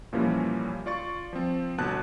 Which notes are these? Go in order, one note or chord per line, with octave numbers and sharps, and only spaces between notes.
A#2 E3 F3 G3 A#3 C#4
F4 D5 C#6 A6
F3 C4
G1 B2 A5 F#6